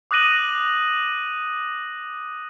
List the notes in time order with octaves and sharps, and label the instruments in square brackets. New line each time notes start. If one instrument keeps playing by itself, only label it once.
[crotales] D6 D#6 F#6 A#6 D#7 F#7